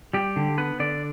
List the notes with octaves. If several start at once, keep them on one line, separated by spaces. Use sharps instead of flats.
G3 G4
D3
B3 B4
D3 D5